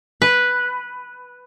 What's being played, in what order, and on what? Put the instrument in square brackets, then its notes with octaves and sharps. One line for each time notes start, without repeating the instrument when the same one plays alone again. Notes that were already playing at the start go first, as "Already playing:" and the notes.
[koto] B4